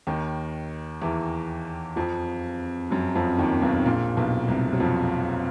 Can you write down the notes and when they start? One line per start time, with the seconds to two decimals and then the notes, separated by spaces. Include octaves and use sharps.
0.07 D#2 D#3
1.01 E2 E3
1.96 F2 F3
2.91 F#2 F#3
3.15 F2 F3
3.38 D#2 D#3
3.62 B1 B2
3.85 A#1 A#2
4.17 B1 B2
4.48 C2 C3
4.73 F#3
4.80 F2 F3